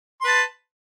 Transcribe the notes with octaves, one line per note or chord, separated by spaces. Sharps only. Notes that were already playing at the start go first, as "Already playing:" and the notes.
B4 A5 C6